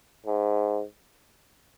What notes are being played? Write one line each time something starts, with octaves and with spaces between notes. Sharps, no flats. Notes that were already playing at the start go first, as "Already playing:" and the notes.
G#2